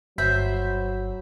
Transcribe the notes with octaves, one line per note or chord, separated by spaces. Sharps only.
G1 F#3 C5 E5 B5